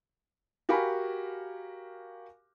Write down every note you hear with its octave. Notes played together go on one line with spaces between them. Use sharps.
F#4 G4 A#4 F5 G#5 B5